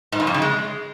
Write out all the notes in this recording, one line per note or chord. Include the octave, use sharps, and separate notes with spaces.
G#2
G2
F2
C#3
G#3